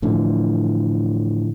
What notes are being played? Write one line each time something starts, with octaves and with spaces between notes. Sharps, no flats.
A2 D3 E3 F3